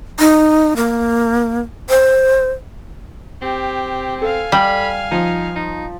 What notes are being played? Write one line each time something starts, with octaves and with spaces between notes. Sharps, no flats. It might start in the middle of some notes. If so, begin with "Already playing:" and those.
D#4
A#3
C5
C4 G4
A4 F5 G#5
G3 B5
F3 D#4
D#4